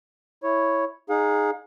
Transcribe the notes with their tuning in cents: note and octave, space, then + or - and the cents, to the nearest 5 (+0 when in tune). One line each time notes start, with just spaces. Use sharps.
E4 +0 C#5 +0
D#4 +0 G#4 +0 F5 +45